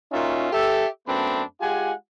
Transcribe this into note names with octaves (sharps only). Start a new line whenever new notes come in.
A#2 C#4 D#4 F4 F#4 E5
G4 A4 E5
F#2 A3 B3 C4 D4 B5
G#3 F4 G4 F#5 G#5